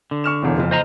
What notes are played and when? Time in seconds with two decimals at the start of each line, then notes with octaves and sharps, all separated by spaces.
0.11 D3
0.24 C#6 F6 E7
0.42 E1 A1 E2
0.57 F#1 F2
0.71 C5 D#5 A#5